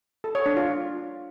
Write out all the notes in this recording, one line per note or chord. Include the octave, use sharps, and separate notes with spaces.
A4
C#5
D4
F4